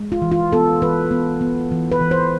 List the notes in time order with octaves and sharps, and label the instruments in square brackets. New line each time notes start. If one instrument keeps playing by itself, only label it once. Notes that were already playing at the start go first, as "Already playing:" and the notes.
Already playing: [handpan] G#3
F4
E3
F4
B3 A4
E3 B4
B3
B3
E3
B4
E3
C5